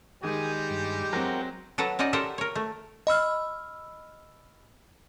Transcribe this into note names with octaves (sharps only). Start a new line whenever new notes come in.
D#3 G3 G#3 G4 G#4 D#6
G2
F#3 C4 F#4 A#4 G5
F#3 A4 B4 F#5 A#5
C#4 D#4 F#4 D5 D#5
G4 A4 A#4 C5 E5 F#5
A#4 C#5
A3
D#5 B5 E6 F6